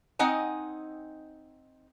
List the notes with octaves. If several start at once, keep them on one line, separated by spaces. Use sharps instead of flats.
C4 D#4 D#5 F#5 G#5